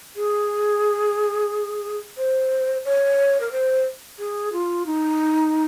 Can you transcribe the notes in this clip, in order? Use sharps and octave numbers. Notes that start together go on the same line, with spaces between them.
G#4
C5
C#5
A#4
C5
G#4
F4
D#4